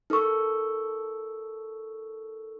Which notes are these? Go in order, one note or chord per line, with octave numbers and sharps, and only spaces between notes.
D#4 A4 A#4 C#6 E6